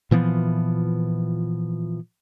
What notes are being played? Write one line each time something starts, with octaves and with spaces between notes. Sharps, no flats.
A#2 E3 F3 B3